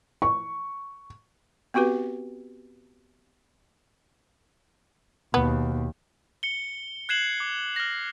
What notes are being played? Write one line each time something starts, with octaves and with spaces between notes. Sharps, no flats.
C#6
B3 C4 F#4 G4 B4
D#2 B2 B3
C#7 G7
F#6 G#6 C7 E7 F#7
D6
F6 A#6